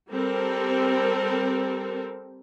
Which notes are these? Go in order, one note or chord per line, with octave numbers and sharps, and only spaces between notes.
G3 C4 A4 A#4